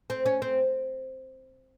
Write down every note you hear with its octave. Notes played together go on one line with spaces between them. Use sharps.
C4
C#4
C4